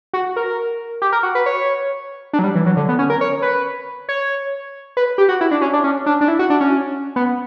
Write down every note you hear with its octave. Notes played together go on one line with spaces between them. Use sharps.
F#4
A#4
G4
A#4
F#4
B4
C#5
D4
F#3
G3
E3
F#3
D3
B3
C#4
A#4
C#5
B4
C#5
B4
G4
F#4
E4
D4
C#4
D4
C#4
D4
D4
E4
F#4
D4
C#4
B3